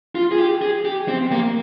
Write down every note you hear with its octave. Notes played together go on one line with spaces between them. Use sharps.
F4
G#4
G4
G#4
G4
C4
A#3